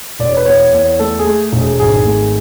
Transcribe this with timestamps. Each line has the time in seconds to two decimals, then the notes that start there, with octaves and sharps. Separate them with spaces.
0.19 E1 D5
0.28 C#5
0.37 B4
0.45 E2 C#5
0.73 E2
0.99 A3 A4
1.19 G#4
1.26 A3
1.53 E1
1.59 G#4
1.79 G#1 G#4
2.06 A3